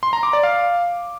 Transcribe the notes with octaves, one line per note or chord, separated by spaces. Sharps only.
C6
A#5
D6
D5
F5